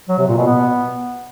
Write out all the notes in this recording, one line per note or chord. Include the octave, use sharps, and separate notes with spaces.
F#3
C3
A#2
B2
B3